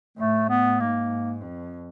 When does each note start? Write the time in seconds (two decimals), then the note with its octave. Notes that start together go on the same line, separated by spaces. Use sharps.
0.17 A2 A3
0.49 B3
0.80 G#2 A#3
1.42 F2